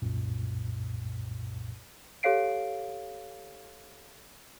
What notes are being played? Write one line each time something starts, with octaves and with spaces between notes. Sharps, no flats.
C2 F#2 A#2
G4 A4 C#5 F5 C7 D7